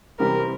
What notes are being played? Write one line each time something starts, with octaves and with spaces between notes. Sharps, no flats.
C3 E3 G3 C4 G4 A#4